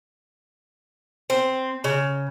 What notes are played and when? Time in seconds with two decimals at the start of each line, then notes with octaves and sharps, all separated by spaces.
1.30 C4
1.84 C#3